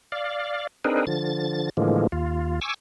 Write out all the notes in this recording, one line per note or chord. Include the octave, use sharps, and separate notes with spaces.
D5 F5
C4 D4 D#4 G#4 A#4 B4
D3 F3 A6
A2 D3 E3 F3 G#3 A#3
D#2 F4
G#5 C#6 D6 E6